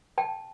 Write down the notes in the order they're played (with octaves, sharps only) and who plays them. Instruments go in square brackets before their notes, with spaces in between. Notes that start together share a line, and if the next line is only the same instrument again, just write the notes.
[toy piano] G5 A5